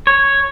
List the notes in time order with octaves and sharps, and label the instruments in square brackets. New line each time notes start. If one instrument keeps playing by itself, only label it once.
[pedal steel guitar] C#5